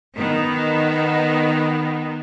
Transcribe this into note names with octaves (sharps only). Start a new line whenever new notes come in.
D#3 B3